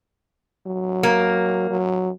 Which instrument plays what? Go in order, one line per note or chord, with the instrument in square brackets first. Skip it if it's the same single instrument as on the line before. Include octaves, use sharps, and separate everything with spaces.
[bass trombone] F#3
[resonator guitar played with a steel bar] A#3
[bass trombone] F#3